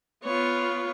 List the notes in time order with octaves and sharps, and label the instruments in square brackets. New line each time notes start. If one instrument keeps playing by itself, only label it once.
[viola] B3 F4 [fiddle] C#5